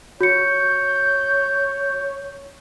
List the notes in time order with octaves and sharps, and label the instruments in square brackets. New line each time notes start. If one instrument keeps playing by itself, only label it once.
[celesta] F#4 C#7 [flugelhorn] C#5 [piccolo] G6